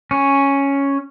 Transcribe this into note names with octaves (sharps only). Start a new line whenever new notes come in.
C#4